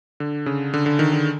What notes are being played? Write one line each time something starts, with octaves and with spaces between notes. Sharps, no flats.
D3
C#3
D3
D3
D#3
D3